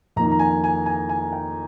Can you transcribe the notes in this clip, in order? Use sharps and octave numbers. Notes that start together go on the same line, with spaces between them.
F2 D#3 A#3 A#5
A#5
G#5
G#5
G#5
G#5
G5